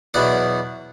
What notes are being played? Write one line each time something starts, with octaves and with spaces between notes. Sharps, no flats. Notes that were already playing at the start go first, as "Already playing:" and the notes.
E2 B2 F#3 D5 F#5